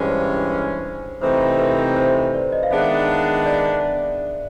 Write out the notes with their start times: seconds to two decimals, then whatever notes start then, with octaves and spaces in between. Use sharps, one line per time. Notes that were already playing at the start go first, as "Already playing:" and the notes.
Already playing: G2 E3 G#3 C#4 C5
1.21 C3 E3 A3 C4 D#4 C5
1.59 B4
1.96 C5
2.15 C5
2.34 D5
2.52 D#5
2.63 F5
2.71 D#3 G#3 B3 D4 E5
3.46 D5